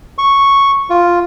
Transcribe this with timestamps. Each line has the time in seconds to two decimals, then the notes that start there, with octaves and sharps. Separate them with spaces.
0.18 C#6
0.90 F4